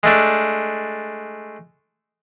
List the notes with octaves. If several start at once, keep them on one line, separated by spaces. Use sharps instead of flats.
G#3 A3 D4